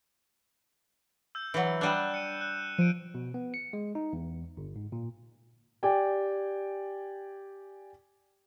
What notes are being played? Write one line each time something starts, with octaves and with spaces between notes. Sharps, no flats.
E6 G6
E3 F#3
G3 D4 F#6 G6 E7
C#7 D#7
F#6
F3 D7 D#7
B2
B3
C#7
G#3
D#4
E2
G1
G#2
A#2
G4 D5 G5 G#5